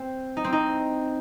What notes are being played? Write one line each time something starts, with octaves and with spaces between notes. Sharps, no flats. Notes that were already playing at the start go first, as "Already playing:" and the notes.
Already playing: C4
D#4
C4
D#4